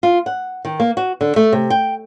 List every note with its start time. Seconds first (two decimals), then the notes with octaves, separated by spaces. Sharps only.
0.03 F4
0.26 F#5
0.65 D#3
0.80 A#3
0.97 F#4
1.21 D3
1.36 A3
1.53 C3
1.70 G5